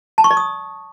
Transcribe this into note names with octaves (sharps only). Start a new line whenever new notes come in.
A5
C#6
D5
D#6